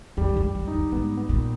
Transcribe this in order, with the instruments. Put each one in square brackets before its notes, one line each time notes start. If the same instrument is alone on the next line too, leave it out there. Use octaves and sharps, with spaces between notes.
[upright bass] F2 [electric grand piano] G3
[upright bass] G2
F#2
[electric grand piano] G3
[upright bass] F#2
[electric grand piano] D#4
[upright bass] F2
[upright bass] G#2 [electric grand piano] B3
[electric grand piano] B3
[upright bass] A#2